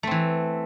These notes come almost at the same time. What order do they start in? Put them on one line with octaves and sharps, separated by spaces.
A3 C4 E3